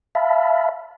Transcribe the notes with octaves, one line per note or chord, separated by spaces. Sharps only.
E5 F5 A5 B5